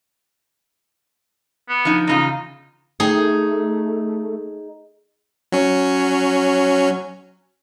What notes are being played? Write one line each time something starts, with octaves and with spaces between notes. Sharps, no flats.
B3
F3 D#4
E2 C#3 D#4 F4
A3 D#4 G#4
F#3 C#4